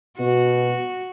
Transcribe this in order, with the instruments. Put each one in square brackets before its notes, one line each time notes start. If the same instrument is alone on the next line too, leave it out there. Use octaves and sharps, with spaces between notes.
[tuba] B2 [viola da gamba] F#4